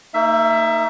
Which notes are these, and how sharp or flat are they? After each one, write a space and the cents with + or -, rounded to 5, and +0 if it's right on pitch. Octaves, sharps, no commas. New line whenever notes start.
A#3 -40 D#4 +0 E5 +15